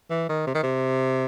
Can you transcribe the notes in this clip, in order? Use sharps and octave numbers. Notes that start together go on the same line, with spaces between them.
E3
D#3
C3
D#3
C3